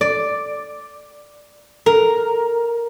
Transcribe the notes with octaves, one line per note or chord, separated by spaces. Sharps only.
D5
A#4